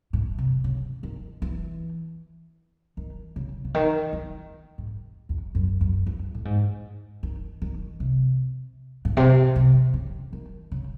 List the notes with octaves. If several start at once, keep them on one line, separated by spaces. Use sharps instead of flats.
A2
C3
C#3
D#3
E3
D#3
C#3
C#3
D#3
D#3
G#2
E2
F#2
F#2
E2
A2
G#2
D#3
D#3
C3
A2
C3
C3
C#3
D#3
C#3